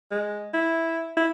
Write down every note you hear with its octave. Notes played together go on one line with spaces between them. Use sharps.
G#3
E4
E4